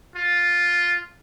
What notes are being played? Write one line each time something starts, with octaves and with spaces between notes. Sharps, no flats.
F4